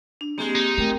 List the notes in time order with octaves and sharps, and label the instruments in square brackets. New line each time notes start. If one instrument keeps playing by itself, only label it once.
[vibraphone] D4
[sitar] G3 G#3 [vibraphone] A#3 C4 G4
[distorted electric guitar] D#4
[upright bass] A3 [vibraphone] C4 A#4 G5